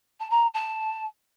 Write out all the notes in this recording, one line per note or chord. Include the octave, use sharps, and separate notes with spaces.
A5
A#5
A5